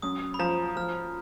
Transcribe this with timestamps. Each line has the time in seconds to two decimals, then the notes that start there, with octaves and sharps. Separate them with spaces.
0.02 F#2 D#6
0.34 B5
0.39 F3 A#5
0.77 F3 F6